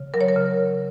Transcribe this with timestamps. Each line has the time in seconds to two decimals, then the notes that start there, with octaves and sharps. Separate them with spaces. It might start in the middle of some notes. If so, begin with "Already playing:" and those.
Already playing: C#3
0.14 F#3 A#4
0.21 C#5
0.29 A#4
0.36 C#3